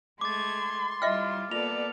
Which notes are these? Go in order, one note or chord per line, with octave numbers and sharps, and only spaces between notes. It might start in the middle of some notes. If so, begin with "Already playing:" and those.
G#3 A3 C6 D6 G#6 A6
G3 E4 F4 D#5 E5 G5 F6
A#3 B3 F4 A4 D5 F7